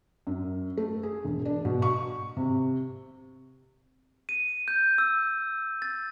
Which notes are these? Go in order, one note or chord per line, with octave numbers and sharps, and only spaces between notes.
F#2
A3
G#4
E1
D4
B2
C#6
C3
D#7
G6
E6
A6